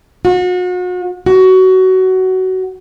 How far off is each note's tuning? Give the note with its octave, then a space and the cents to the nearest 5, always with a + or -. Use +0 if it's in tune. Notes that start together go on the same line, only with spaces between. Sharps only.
F#4 -40
F#4 +20